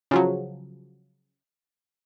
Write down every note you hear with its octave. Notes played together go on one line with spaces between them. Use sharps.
C#3 F3 F#3